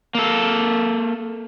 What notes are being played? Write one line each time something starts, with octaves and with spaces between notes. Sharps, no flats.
A#3 A4